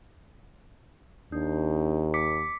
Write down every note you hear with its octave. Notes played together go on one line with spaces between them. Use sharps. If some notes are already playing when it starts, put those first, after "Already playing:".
D#2 D4
D6 B6 C#7